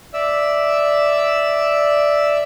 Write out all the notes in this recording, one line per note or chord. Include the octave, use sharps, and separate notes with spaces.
D5 E5 E6